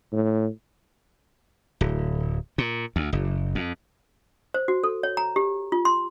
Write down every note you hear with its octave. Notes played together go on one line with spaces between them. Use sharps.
A2
D1
A#2
D2
F#1
F2
C5
F#4
A4
C#5
A#5
G4
F4
C6